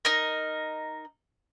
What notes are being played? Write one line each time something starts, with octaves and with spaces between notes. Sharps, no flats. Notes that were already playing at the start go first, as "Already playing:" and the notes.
D#4 A#4